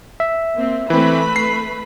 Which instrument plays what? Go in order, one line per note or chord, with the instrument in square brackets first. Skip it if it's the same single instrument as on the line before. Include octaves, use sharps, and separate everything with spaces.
[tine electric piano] E5
[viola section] A#3 C4
[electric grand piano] E3 C4 [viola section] A3 B4 B5
[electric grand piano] C7